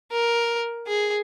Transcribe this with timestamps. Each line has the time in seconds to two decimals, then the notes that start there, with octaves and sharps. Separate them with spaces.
0.12 A#4
0.87 G#4